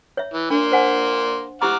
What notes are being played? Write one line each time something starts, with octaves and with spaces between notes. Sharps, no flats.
C#5 E5
E3
A#3 D4 C6
C5 F#5 G#5
E4 G4 F#5 A#5 D6 F6